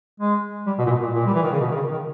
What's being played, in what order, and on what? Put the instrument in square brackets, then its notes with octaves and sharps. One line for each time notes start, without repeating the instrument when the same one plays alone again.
[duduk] G#3
G3
B2
A#2
B2
A#2
A#2
G3
E3
D#3
C#3
B2
D#3
C#3
D#3